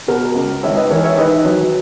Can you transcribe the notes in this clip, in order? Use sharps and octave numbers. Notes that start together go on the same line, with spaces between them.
B2 F#4 A#4
C#2
G#1 C#5 E5
B4 D#5
E3 A#4 C#5
C#5 E5
D#3 B4 D#5
F#3